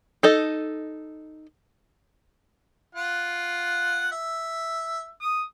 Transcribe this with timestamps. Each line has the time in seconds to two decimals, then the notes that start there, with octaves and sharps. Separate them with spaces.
0.23 D#4 A4 D#5
2.95 F4 F#5
4.12 E5
5.21 D#6